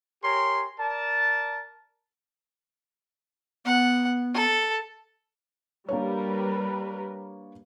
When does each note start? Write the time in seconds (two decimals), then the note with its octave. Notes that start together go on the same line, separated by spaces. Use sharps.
0.23 G4 A#4 C#5 G#5 C6
0.79 A#4 D5 A5
3.65 B3 F#5
4.34 A4
5.89 G3 A#3 D4 A#4 B4 C#5